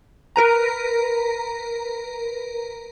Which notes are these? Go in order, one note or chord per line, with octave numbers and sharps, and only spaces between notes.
A#4 B4 A#5